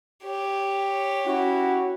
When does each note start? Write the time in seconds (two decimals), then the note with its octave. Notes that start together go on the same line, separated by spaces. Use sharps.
0.23 G4 C#5
1.26 C#4 E4 F#4